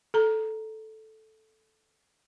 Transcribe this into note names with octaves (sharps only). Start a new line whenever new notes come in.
A4 A#5